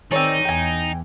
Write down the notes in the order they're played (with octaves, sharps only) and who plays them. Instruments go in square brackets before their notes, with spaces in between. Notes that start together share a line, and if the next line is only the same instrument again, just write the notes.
[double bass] D#3 [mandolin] C4 D5 [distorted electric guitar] D#4 [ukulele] G#4 C#5
[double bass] E2 [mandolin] G5 G#5